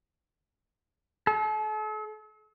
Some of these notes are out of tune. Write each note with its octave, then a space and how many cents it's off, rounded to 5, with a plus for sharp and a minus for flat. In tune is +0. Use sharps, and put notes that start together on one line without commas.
A4 -40